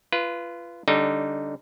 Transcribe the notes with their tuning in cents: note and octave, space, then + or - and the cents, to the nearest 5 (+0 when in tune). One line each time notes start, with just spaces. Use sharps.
F4 -25 B4 +0
D3 -20 G3 +0 D#4 -15